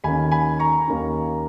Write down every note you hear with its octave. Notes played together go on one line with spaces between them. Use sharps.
D#2 D#3 A#3 C#4 G#5 B5
G#5 B5
A#5 C#6
D#2 D#3 A#3 C#4